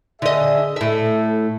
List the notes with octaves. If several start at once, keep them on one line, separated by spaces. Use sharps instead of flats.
D3 D4 G#4 D#5 E5
A2 A4 E5